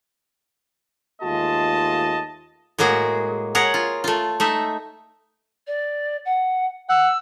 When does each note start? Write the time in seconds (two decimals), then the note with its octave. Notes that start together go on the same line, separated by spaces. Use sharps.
1.22 D#2 G#3 A3 F4 D#5 A5
2.78 A2 G#3 A#3 F#4 G#4
3.55 G#4 A#4 C#5 F#5
3.74 F4
4.04 A3 F4
4.40 A3 D#4 E5
5.67 D5
6.25 F#5
6.89 F#5 E6